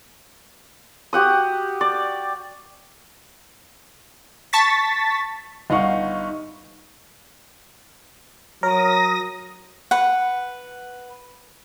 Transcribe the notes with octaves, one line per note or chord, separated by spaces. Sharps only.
F#4 G4 F#5 D#6
D5
A5 C#6 A6 B6
G1 D#4 F5 F#5 C#6
F#3 A#4 C#5 A#5 D#6 A#6
B4 F#5